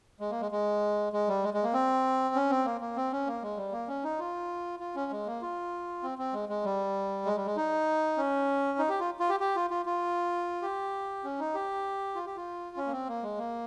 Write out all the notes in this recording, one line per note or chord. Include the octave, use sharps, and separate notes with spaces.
G#3
A#3
G#3
G#3
G#3
G3
G#3
G#3
A#3
C4
C#4
C4
A#3
A#3
C4
C#4
A#3
G#3
G3
A#3
C#4
D#4
F4
F4
C#4
G#3
A#3
F4
C4
C4
G#3
G#3
G3
G#3
G3
G#3
D#4
C#4
D#4
G4
F4
F4
G4
G4
F4
F4
F4
G4
C#4
D#4
G4
F4
G4
F4
C#4
A#3
C4
A#3
G#3
A#3